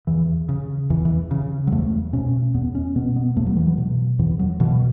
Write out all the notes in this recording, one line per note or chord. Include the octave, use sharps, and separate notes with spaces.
E2 E3
C#3
E2 E3
E3
C#3
F#3
E2 A3
B2 C#4
E2 B3
C#4
B2 B3
B3
E2 A3
F#3
E3
F#3
B2
E2 E3
F#3
B2 E3